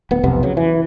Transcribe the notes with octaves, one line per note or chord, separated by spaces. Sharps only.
D1 B3
B1 F2 C3 B3
C#3 F#3
E3